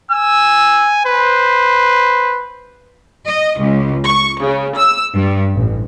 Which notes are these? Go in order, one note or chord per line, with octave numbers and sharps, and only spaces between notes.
G#5 E6
B4 C5
D#5
C#2
C#6
C#3
E6
G2
A1